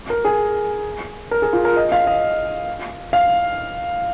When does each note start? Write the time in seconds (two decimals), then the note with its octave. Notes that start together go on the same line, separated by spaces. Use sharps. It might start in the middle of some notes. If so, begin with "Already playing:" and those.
0.10 A#4
0.25 G#4
1.31 A#4
1.42 G#4
1.53 F4
1.65 A#4
1.77 D#5
1.92 F5
2.07 D#5
3.13 F5